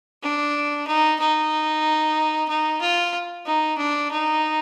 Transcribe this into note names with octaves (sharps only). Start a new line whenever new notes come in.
D4
D#4
D#4
D#4
F4
D#4
D4
D#4